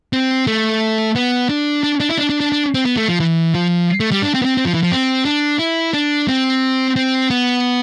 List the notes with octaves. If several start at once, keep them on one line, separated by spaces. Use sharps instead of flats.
C4
A3
B3
D4
D4
D4
E4
D4
D4
D4
D4
C4
B3
A3
F3
E3
F3
A3
G3
D4
C4
B3
C4
C4
F3
E3
F3
C4
D4
E4
D4
C4
C4
B3